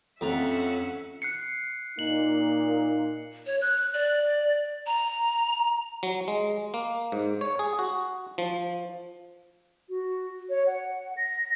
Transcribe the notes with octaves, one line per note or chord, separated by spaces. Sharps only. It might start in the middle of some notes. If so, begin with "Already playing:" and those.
F2 C#4 E5 F#5 A#5
F#6 C7 C#7
A#2 A#3 D#4 F#7
C#5
F#6
D5
A#5
F#3
G#3
A#3
G#2
C#5
G#4
F#4
F3
F#4
C#5
F#5
A#6